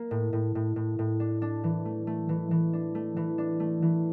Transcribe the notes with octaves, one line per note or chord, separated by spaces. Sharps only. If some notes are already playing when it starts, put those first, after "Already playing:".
Already playing: A#3
A2
A2
A2
A2
A2
D4
D4
E3
A3
A3
E3
E3
D4
A3
E3
D4
A3
E3